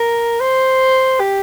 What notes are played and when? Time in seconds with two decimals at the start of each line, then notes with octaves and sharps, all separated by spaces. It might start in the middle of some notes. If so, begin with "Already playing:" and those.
Already playing: A#4
0.40 C5
1.20 G4